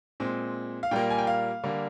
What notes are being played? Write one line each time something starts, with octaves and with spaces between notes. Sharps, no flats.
A#2 G#3 C4
F5
A#2 G3 A#3 G5
G#5
G5
F5
D3 G3 A#3